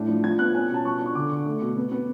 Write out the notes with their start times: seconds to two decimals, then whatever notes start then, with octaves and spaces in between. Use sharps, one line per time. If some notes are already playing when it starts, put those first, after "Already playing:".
Already playing: A2 D4
0.08 F3
0.24 F3 G#6
0.39 B3 F#6
0.55 C#4 G#5
0.69 B2 A5
0.85 F3 C#6
1.00 D4
1.06 C#6
1.15 D3 D6
1.31 D3
1.45 A3
1.62 B2
1.76 B3
1.91 B3